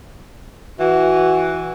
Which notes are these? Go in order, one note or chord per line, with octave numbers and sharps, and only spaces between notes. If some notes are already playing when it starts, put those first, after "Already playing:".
E3 F#4